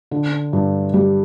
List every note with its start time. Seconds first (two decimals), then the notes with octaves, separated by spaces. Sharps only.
0.11 D3
0.53 G2
0.94 G3